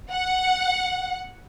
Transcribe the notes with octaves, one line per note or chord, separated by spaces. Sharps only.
F#5